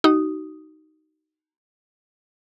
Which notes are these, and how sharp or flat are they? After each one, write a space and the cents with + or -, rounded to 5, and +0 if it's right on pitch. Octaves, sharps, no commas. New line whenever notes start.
D#4 +0 F#4 +40 D#6 +0